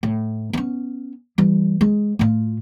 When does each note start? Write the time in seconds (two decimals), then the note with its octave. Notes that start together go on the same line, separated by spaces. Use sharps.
0.03 A2
0.53 B3 C#4
1.38 E3 G3
1.81 G#3
2.19 A2 F4